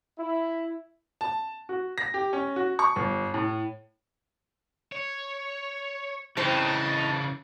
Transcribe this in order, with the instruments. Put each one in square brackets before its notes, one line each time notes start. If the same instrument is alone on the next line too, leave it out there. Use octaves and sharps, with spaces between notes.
[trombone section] E4
[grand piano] A5
F#4
A#6
G4
C#4
F#4
C#6
G1
A2
[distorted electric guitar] C#5
[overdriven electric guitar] C#3 E3 [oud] C4 E4 [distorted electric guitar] D#4 [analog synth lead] A5